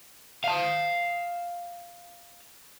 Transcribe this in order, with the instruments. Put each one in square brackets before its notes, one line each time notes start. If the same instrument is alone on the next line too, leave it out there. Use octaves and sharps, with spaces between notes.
[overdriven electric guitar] F5 A5